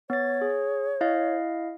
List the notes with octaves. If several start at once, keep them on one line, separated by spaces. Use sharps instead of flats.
B3 C#5 A6
G#4
E4 D#5 F5